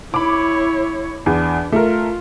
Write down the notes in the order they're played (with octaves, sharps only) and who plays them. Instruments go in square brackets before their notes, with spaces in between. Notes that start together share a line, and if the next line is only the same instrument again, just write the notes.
[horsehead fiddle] E4 C#5 [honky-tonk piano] B5 D6
[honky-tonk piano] E2 [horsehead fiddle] D4
[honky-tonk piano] A3 A#4 [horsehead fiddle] F4